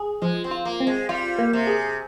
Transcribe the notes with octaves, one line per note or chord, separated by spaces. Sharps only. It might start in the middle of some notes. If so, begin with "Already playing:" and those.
Already playing: G#4
F3 G#3
C4
F4
A#3
C4
G#3
G3 F4
A#3
C3
G#4